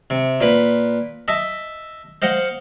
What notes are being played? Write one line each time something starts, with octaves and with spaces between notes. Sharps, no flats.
C3
A#2 B4
D#5 E5 A5
C5 D#5 F5 F#5